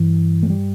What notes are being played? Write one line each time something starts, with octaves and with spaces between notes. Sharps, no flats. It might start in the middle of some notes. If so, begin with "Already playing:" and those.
Already playing: G2 E3
A3
G3